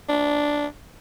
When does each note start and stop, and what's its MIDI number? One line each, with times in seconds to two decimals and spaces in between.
0.09 0.66 62